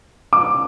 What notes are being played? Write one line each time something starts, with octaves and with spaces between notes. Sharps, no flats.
D6